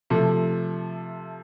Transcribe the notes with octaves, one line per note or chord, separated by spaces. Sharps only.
C3 F3 A3